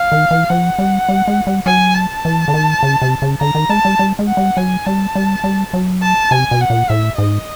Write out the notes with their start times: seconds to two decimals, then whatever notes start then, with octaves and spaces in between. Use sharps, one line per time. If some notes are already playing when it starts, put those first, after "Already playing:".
Already playing: F5
0.12 D#3
0.31 E3
0.50 F3 F#5
0.79 G3
1.09 G3
1.28 G#3
1.47 G3
1.66 F#3 G#5
1.95 A5
2.25 E3
2.48 D3
2.54 D#3
2.83 C#3
3.02 C3
3.22 C#3
3.41 D3 A#5
3.55 D#3
3.70 G#3 A5
3.85 G3
3.99 G3
4.19 G#3
4.28 F#5
4.37 G3
4.57 F#3 G#5
4.86 G3 A5
5.15 G3
5.44 G3
5.73 F#3
6.03 A5
6.31 C3 G#5
6.51 B2
6.61 F#5
6.70 A#2
6.90 A2 E5
7.18 G#2 D#5